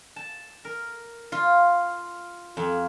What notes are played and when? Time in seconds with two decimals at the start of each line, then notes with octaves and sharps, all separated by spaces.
0.16 A5
0.65 A#4
1.32 F4
2.57 F2